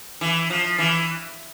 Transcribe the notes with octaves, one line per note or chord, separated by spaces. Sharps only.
E3
F3
E3